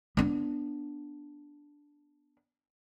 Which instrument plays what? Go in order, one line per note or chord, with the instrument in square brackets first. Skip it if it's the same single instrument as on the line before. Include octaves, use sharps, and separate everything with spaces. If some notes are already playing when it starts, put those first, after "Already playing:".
[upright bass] B3 D4